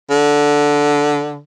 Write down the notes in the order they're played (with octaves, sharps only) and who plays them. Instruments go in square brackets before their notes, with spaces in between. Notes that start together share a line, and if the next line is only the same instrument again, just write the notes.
[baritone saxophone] D3